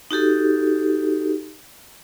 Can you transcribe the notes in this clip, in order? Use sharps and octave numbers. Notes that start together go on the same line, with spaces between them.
D#4 F#4 G4 A4